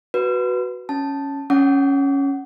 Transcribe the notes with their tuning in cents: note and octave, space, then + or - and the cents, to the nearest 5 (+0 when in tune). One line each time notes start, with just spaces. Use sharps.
F#4 +0 B4 +0
C#4 +0 A5 +0
C#4 +0 F#5 +15 D6 -40